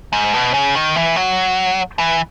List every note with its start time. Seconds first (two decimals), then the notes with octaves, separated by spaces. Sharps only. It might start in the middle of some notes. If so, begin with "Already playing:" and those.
0.13 G#2
0.34 B2
0.54 C#3
0.75 D#3
0.96 E3
1.16 F#3
1.99 E3